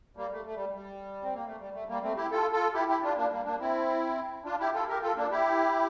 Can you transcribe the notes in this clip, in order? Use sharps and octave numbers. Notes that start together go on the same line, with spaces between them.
G3 A#3
A3
A3
G3
G3
C4
A#3
A3
G3
A3
G3 A#3
A3 C4
E4 G4
F4 A4
F4 A4
E4 G4
E4 G4
D4 F4
A#3 D4
G3 A#3
A#3 D4
C4 E4
D4 F4
E4 G4
F4 A4
G4 A#4
F4 A4
A#3 D4
E4 G4